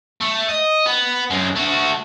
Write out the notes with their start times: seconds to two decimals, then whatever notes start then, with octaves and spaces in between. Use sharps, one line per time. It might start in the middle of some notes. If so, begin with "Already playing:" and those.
0.21 A3
0.49 D#5
0.86 B3
1.30 F#2 G#3
1.56 A3 F#4